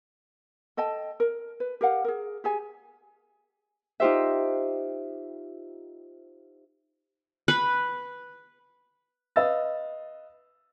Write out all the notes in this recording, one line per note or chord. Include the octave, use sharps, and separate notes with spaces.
A4 D#5 G5 A5
A#4
B4
G4 A#4 F5 F#5
G#4 A#4
G4 G#4 G#5
D#4 F4 G4 C5 E5
B4
B4 D#5 F5 E6 A6